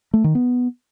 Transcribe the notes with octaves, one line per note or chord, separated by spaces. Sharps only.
A3
D#3
B3